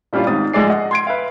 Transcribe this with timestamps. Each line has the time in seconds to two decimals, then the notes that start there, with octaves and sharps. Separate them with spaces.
0.13 A#2 G3 C#4 D4 E4 F4
0.27 G#1 G#2 C4 D#6 A6
0.53 A#1 F3 G#3 G#4 D5 C7
0.70 D#5 F#5
0.91 C6 G#6 D7
1.07 B4 E5 F5